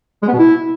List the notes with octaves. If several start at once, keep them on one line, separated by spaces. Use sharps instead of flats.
G#3
B3
B2
E4